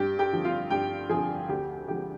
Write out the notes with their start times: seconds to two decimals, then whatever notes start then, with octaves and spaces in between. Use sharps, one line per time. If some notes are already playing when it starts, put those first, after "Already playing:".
Already playing: G2 G4 G5
0.19 G4 G5
0.33 D3 F3
0.45 F4 F5
0.71 G2 G4 G5
1.09 D3 F3 G#4 G#5
1.49 D2 G4 G5
1.88 D3 F3 G#3 G4 G5